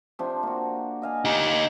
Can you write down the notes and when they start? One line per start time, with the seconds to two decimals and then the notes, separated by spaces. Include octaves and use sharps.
0.19 C3 F3 D4
0.43 A#3 F#4
1.02 D#5 F5 G#5
1.25 D#4 G4